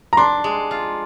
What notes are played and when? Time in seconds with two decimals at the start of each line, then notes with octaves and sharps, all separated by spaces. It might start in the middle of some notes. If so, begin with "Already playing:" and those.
0.13 A#5
0.17 D4 C6
0.44 G#3
0.71 F4